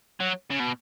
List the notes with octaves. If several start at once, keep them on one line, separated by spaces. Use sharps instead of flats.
F#3
C#3
B2